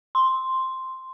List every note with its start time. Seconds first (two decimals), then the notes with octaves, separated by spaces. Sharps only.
0.15 C6